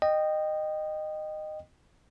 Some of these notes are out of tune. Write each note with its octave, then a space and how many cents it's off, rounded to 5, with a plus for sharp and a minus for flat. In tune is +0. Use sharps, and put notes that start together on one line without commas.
D#5 -15 G5 +0